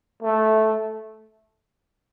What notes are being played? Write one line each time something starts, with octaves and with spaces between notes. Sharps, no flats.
A3